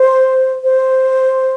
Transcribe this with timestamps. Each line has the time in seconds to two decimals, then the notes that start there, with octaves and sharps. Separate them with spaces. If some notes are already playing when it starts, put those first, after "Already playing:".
Already playing: C5
0.64 C5